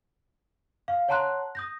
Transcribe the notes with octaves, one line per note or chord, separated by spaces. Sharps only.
F5
C#5 F#5 A5 A#5 C6 F#6
D#6 G6 A#6